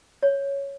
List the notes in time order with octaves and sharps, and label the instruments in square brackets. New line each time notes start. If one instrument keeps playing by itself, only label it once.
[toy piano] C#5